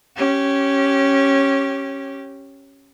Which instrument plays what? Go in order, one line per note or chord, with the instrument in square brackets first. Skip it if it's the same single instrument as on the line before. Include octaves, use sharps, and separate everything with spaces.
[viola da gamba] C#4 G4